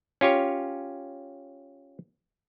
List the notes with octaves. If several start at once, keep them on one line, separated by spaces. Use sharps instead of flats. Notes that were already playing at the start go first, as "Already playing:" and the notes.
C#4 F4 G4 C#5